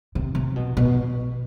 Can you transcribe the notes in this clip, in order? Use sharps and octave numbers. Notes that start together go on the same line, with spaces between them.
C3
C3
B2
B2